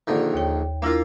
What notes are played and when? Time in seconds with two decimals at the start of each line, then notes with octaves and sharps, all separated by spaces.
0.07 A#1 D3 D#3
0.34 D#2 C#5 G5
0.82 A#3 D4 E4 F4 A#4